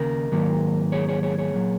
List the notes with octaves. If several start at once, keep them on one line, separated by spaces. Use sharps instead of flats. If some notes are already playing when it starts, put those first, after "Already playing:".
Already playing: D#2 C#3 A#3 A#4 D#5
G#2 D#3 F#3 A#3
G#4 C#5
G#4 C#5
G#4 C#5
G#4 C#5
A#2 F#3 A#3